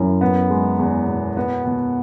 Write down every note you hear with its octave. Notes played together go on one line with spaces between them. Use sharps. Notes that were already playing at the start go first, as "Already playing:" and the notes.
Already playing: F#2 E4
B3
G#3
E2
B2
B3
B2